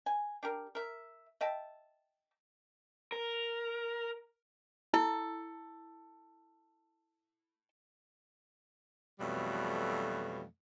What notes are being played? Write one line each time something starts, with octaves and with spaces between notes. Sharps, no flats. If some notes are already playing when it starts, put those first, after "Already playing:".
G#5
D4 G4 A#4
A#4 E5
D#5 E5 G5 A5
A#4
E4 A4
F2 B2 E3 F#3 G3 A3